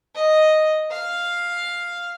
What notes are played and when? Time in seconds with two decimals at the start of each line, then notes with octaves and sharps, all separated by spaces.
0.15 D#5
0.91 F5